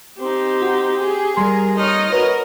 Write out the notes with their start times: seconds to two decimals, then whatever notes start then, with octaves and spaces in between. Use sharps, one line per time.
0.19 C4 D#4 G4
0.62 F#4
1.00 G#4
1.37 G3 A#4 C6
1.77 D#4 C#5 D#5 F6
2.12 F#4 A#4 B4 C#5